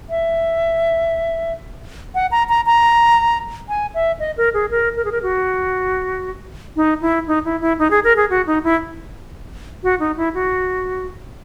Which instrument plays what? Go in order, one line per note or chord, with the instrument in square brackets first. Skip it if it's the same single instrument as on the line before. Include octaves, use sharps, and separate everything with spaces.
[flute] E5
F#5
A#5
A#5
A#5
G#5
E5
D#5
A#4
G#4
A#4
A#4
G#4
A#4
F#4
D#4
E4
D#4
E4
E4
D#4
G#4
A#4
G#4
F#4
D#4
E4
F#4
D#4
E4
F#4